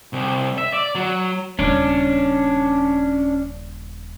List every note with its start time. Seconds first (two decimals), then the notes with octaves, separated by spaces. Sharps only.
0.13 C2
0.58 E5
0.73 D5
0.95 F#3
1.59 D#1 C#3 C#4 D4